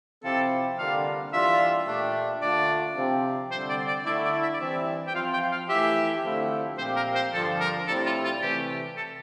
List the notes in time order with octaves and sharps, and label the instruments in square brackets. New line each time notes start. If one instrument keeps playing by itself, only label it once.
[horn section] C3 F3 C4 E4 G4 [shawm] A4
[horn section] D3 G3 A#3 D4 F4 [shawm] F5
[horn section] E3 G3 D4 F4 [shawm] E5
[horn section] A#2 A3 D4 G4
[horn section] D3 A3 D4 F4 [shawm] D5
[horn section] C3 F3 C4 G4
[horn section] D3 G3 C4 [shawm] C5
[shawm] D5
D5
[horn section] D3 A3 E4 [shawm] D5
[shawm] D5
E5
D5
[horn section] E3 G3 C4 E4 [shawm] E5
[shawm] G5
[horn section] F3 C4 F4 [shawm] F5
[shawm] G5
F5
[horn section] E3 A3 E4 G4 [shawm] E5
[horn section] D3 F3 A3 C4 E4
[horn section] A#2 F3 C4 G4 [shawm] C5
[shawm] A#4
C5
[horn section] G2 D3 F3 [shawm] A4
[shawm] A#4
[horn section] A2 G3 C4 E4 G4 [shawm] A4
[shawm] F4
F4
[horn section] C3 E3 A3 [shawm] G4
[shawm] A4